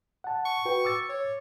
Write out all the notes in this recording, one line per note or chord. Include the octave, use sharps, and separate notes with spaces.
F#5 A5
C#6
F#4 B4 G5
D6 E6 A6
C#5